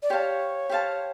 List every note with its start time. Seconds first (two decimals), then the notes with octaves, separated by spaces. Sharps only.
0.02 D5
0.10 G4 C5 C#5 F5 A5
0.70 G4 C5 F5 A5